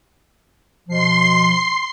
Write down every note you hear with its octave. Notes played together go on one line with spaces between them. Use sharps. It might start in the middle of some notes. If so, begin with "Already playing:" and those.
B2 F3 C6 C7